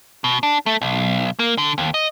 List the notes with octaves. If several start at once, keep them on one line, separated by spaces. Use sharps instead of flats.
B2
D4
A3
B1
A#3
D3
D#2
D#5